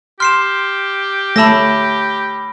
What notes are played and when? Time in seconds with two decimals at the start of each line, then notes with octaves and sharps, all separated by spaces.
0.20 G4 C6 F6 C7 E7
1.36 A3 C#5 A5 B5 E6 A#6